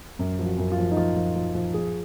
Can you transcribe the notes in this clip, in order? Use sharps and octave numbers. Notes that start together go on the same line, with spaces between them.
F#2
F3
F#4
F#2
F4
F3
D#4
F3 F4
F3
F3
F3
F3 G#4